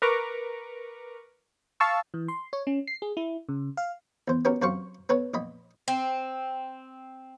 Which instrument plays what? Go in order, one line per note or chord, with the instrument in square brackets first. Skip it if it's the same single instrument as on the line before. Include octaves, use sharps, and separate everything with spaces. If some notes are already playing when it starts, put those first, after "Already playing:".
[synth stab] A#4 B4 A#5 C#6 D6
F5 A5 C#6 E6
[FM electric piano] E3
C6
C#5
C#4
C7
G#4
E4
C#3
F5
[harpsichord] E2 C5
B3 C#4 F#4 G4 A#4
F#2 C3 F#4 C5 F5 C#6
B3 A4 B4 C#5
A#1 D#5 B5
[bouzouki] C4